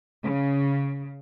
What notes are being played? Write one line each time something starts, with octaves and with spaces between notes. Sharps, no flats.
C#3